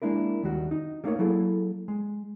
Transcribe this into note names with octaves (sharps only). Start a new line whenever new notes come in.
G#3 A#3 D4 E4 A#4
D#2 D#3 G3 F#4
D#4
G3 A3 A#3 D#4 A#4 C#5
F#3 A#3 E4 G#4 A4
G#3